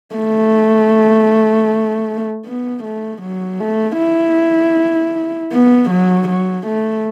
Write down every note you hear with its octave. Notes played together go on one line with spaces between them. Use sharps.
A3
B3
A3
F#3
A3
E4
B3
F#3
F#3
A3